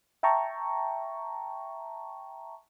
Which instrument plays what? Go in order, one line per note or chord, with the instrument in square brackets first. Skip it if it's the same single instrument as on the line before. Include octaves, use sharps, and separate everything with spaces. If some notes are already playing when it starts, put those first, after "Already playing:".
[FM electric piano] E5 G5 A5 A#5 C#6